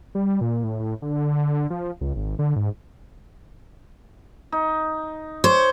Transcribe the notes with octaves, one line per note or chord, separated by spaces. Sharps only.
G3
A#2
A2
A2
D3
F3
C#2
G#1
D3
G#2
D#4
C5 C#5